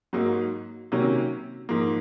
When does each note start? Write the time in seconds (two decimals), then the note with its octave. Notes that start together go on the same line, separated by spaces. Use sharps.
0.13 G#2 F#3 A#3 D#4
0.92 C3 D#3 F#3 A#3 C#4
1.69 G#2 F3 A#3